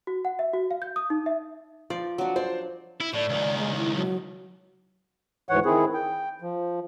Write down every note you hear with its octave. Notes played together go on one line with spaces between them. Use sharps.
F#4
F#5
E5
F#4
F5
G6
D#6
D#4
E5
F3 D5
F#3 D4
C5 D5
E4
A2 D5
C#2 D#3
G#3
E4
F#3
D2 G#2 E3 C#5 F#5
D#3 C4 E4 G#4
G5
F3